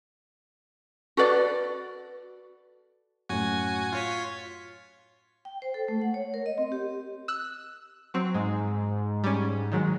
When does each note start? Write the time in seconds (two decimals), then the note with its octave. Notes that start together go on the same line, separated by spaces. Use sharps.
1.17 F#4 A4 B4 D5
3.29 F#2 A2 F#4 G#5
3.93 F4 C#5 B6
5.45 G5
5.62 C5
5.74 A4
5.88 A3
6.02 F#5
6.14 C#5
6.34 A#4
6.46 D#5
6.58 C4
6.72 G4
7.28 E6 F#6
8.14 F#3 C4
8.34 G#2 G#3
9.24 G3 C#4
9.72 D#3 F#3 G#3